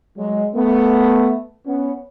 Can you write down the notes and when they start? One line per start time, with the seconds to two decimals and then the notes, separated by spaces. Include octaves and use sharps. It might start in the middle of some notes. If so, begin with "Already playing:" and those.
0.18 F#3 G#3
0.55 A3 B3
1.66 B3 C#4